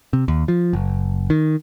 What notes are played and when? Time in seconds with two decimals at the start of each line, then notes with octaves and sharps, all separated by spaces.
0.13 C3
0.28 D#2
0.48 F3
0.73 F#1
1.30 D#3